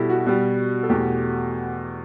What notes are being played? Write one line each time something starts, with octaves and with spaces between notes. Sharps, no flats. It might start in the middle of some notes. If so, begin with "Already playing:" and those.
Already playing: B2 G3 E4 G4 A4
F#4
B2 G3
A4
E2 B2 A3 G4